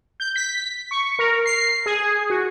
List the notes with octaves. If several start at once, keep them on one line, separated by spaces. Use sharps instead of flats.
G6
B6
C#6
A#4
C7
G#4
F#4